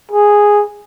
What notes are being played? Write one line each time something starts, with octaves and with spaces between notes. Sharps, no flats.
G#4